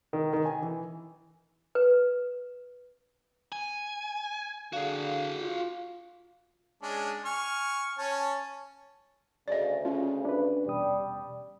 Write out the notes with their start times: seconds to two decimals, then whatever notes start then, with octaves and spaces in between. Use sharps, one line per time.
0.13 D#3
0.33 D#3
0.45 G#5
0.62 E3
1.75 B4
3.52 G#5
4.73 D3 F#4 G#4 F5
5.41 F4
6.82 G#3 C#4 D4
7.25 G#5 C#6 F6
7.98 C#4 C#5 A5
9.48 D2 C#3 D5 D#5
9.85 C#4 F4
10.25 D4 B4
10.66 E2 B2 G3 D#6